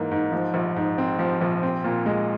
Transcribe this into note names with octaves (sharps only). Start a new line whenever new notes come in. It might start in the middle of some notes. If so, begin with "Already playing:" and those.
Already playing: G#2 E3 A#3
G#2
F3
A#1
G#2
C4
F3
A#1
C4
A#2
G#3